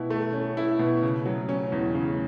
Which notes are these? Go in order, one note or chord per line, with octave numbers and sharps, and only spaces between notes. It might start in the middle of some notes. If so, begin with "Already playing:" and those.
Already playing: B2 E4
A3
C#4
E4
B2
C#3
F#3
C#4
E2
C#3